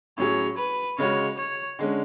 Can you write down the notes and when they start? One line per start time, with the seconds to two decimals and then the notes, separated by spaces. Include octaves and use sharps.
0.18 A2 F#3 C#4 G#4 C#5
0.58 B4
0.98 C#3 G#3 C#4 F#4 C#5
1.38 C#5
1.79 D3 G#3 C#4